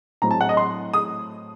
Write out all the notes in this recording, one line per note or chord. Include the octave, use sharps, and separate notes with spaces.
A2 F#3 C4 A#5
A5
F#5
D#5
C6
D#6